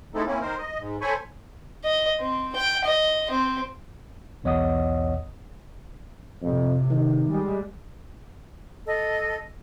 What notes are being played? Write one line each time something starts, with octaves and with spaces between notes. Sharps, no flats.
G#3 A3 C4 D#4 E4 A4
A#3 C4 C#4 E4
D#3 A#4 C5
D#5
G#2
A4 C5 C#5 G#5 B5 C#6
D#5
C4
G5
D#5
C4
B1 E2 C#5 D#5 F#5 D#6
F2 A2 C3
D#3
G3 G#3
A4 D#5